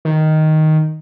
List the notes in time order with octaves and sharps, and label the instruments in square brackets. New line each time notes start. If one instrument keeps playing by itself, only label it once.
[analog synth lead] D#3